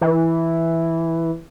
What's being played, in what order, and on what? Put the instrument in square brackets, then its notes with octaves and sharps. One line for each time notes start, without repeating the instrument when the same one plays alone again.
[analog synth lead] E3